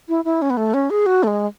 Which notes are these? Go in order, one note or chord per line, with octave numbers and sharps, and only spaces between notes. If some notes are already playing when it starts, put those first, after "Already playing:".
E4
E4
C#4
B3
A3
C#4
G#4
F#4
A3
G#3